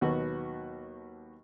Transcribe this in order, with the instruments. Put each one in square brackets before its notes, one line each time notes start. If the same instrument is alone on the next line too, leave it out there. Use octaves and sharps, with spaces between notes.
[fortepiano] D#2 B2 F#3 B3 F#4 F#6